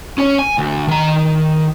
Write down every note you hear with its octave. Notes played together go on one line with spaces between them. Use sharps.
C#4 C#5
G#5
D2
D#3 A#5